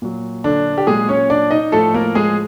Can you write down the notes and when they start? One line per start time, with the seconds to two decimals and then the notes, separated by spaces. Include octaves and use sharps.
0.02 A#2 F#3
0.44 D3 D4
0.78 G4
0.87 A#2 F#3 G#3 G#4
1.09 C#4 C#5
1.30 D4 D5
1.51 D#4 D#5
1.72 A2 F3 A3 A4
1.94 A#3 A#4
2.15 G#3 G#4